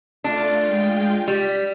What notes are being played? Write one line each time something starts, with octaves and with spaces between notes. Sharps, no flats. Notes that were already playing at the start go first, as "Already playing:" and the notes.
A3 D4 F4
G#3 F4 G5
G3 B6